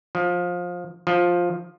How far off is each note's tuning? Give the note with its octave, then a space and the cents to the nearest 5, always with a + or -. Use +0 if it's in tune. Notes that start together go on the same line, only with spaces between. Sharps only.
F3 +20
F3 +10